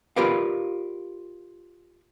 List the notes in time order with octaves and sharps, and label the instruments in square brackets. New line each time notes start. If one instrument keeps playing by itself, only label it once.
[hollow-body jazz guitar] F4 G4 A#4 B4 D5 F5